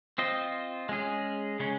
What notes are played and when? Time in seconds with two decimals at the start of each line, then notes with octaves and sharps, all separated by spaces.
0.18 C4 F4 C5 D#5
0.89 G#3 C#4 G#4
1.59 C#3 G#3 C#4